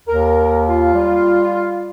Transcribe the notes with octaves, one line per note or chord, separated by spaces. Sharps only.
D#2 A#4
F4
G3